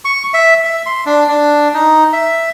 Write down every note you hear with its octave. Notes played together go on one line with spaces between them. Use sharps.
C#6
E5
E5
C6
D4
D4
D#4
E5